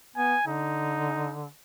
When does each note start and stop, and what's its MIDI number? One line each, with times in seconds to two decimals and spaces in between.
0.16 0.35 59
0.16 0.44 80
0.47 1.46 50
0.47 1.37 63